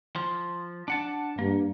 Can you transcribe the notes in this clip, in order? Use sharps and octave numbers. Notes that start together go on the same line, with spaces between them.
F3
D4 F#5 A5
G2 A#3